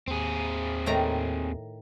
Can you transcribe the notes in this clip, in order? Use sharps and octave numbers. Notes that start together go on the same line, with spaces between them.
D#2 C4 G#4
A2 D#3 A#5